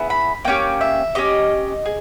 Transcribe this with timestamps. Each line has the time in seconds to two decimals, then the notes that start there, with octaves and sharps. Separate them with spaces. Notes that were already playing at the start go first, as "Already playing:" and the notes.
Already playing: B3 E4 G#4
0.10 B5
0.45 A#3 C#4 G4 G5
0.81 E5
1.15 C#4 G4 D#5
1.86 G#4